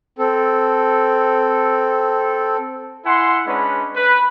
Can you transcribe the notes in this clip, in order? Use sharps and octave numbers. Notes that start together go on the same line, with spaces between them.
C4 A4
E4 F#5 G#5 C6
G#3 C#4 D4 B4 B5
B4